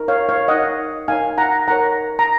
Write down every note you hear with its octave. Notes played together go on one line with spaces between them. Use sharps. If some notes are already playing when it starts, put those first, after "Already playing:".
Already playing: D#4 A#4
C#5 F5
C#5 F5
D#4 A#4 C#5 D#5 F#5
D#4 A#4 C#5 F5 G#5
F#5 A#5
D#4 A#4 C#5 F#5 A#5
A#5